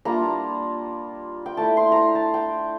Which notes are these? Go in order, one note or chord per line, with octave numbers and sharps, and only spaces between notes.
G3 A#3 D4 F4 A#5
G5
A3 E4 A5
C6
A#5 C6
A5
G5